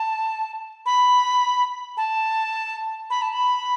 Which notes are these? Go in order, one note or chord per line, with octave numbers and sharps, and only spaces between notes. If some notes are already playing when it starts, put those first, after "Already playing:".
Already playing: A5
B5
A5
B5
A5
B5